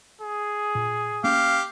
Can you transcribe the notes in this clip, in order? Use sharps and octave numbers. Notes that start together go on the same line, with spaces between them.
G#4
A#2
A#3 C#4 G4 F5